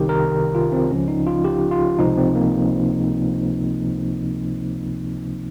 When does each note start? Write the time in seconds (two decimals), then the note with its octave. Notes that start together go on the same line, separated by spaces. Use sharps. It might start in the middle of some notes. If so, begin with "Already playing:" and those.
Already playing: C2 C3 D#3 G4
0.09 A#4
0.55 F4
0.72 C4
0.91 C#2 C#3 F3 C#4
1.08 D#4
1.27 F4
1.44 G4
1.71 F4
1.99 C#2 C3 F3 D#4
2.18 C4
2.35 A#3